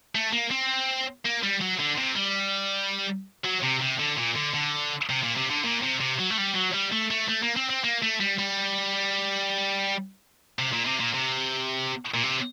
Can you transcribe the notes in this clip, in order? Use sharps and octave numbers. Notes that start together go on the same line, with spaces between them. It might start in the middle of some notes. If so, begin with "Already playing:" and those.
A3
A#3
C4
A#3
G3
F#3
D3
C3
G3
F#3
C3
C3
D3
A#2
D3
D3
C3
A#2
C3
D3
A#2
C3
C3
F#3
A3
G3
F#3
G3
A3
A3
A3
A#3
C4
C4
A#3
A3
G3
G3
C3
A#2
C3
A#2
C3
A#2
C3